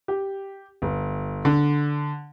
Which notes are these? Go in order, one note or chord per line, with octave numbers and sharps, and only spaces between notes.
G4
G1
D3